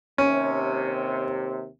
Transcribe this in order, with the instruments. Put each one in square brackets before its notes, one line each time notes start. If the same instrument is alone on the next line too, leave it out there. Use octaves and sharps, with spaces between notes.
[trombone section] D#2 C3 [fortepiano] C#4